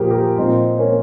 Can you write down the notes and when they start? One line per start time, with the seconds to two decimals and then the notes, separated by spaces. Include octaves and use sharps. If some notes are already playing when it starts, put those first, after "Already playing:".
Already playing: A#2 F3 G4 G#4 A#4 C5
0.10 G4 A#4
0.38 A#2 F3 C4 D#4
0.78 A#3 C#4